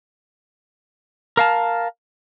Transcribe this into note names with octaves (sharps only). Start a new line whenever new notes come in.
A#4 F5 A5